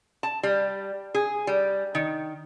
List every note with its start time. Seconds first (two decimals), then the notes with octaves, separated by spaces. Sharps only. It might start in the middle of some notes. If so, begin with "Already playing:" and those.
0.23 A5
0.43 G3
1.14 G#4
1.47 G3
1.95 D#3